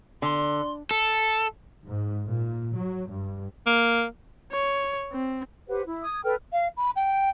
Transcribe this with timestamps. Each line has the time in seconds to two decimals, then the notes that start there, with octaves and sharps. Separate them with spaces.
0.22 D3 C6
0.91 A4
1.86 G#2
2.27 A#2
2.75 F#3
3.10 G2
3.66 A#3
4.52 C#5
5.12 C4
5.69 G4 B4 C5 F#5
5.85 E4
6.04 D#6 G#6
6.24 A4 B4 G5 F6
6.52 F5
6.77 B5
6.96 G5